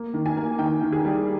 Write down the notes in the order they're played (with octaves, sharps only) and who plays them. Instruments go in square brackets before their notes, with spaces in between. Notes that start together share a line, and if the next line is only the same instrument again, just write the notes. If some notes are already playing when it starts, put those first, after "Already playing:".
Already playing: [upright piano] A#3
D#3
G#5
A#3
D#3 G5
D#3
G#4
G3